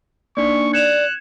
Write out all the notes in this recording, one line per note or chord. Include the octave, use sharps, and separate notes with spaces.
A#3 D4 D#4 D5 C#6
D5 F#6 G#6 C#7 E7 F7